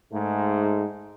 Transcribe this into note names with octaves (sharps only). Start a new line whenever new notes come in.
G#2 A3